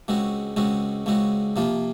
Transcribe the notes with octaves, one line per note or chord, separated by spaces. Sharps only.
C#2 C#3 G#3 C4 F#4
C#2 C#3 G#3 C4 F#4
C#2 C#3 G#3 C4 F#4
C3 F3 A#3 F4